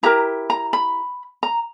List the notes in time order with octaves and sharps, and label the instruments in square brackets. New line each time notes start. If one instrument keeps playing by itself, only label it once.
[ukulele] E4 G4 A#4 A#5
A#5
B5
A#5